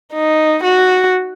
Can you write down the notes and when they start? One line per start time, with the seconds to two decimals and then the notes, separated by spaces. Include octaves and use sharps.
0.14 D#4
0.63 F#4